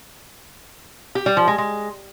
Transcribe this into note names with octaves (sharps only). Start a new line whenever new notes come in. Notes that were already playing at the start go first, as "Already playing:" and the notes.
G4
G3
F3
G#3
G#3